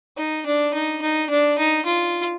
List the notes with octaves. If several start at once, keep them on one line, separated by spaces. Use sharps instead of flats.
D#4
D4
D#4
D#4
D4
D#4
F4